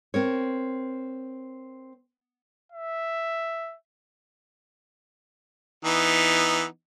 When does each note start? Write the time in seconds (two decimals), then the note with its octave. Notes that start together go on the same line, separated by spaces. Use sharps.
0.14 C4 A#4 C#5
2.72 E5
5.85 E3 B3 D#4